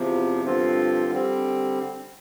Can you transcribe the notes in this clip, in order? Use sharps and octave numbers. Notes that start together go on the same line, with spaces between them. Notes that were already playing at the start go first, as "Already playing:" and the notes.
Already playing: E2 C3 F3
G2 D3 F3 C4 F4
D3 G3 C4